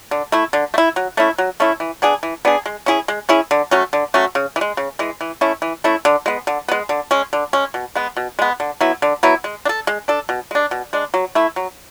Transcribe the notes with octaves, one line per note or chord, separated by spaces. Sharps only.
D3
A3 E4
D3
A3
E4
F#3
A3 C#4 E4
F#3
A3 C#4 E4
E3
B3 D4 G#4
E3
B3 D4 G#4
G#3
C#4 E4 G#4
G#3
C#4 E4 G#4
D3
F#3 A3 C#4
D3
F#3 A3 C#4
C#3
E3
G#3
C#3
E3 G#3
E3
A3 C#4 E4
E3
A3 C#4 E4
D3
G#3 B3
D3
G#3 B3
D3
G#3 C#4
D3
G#3 C#4
B2
G#3 B3
B2
G#3 B3
D3
F#3 B3 E4
D3
F#3 B3 E4
G#3
D4
A4
G#3
D4 A4
B2
G#3 D4
B2
G#3 D4
F#3
A3 E4
F#3